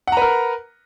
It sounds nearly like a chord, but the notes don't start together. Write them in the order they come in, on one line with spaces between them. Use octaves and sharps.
F#5 A#5 B4 A#4